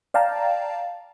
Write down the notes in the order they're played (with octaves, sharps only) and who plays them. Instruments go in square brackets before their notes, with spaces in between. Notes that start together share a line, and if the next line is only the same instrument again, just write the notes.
[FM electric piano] D5 F5 G5 A5 A#5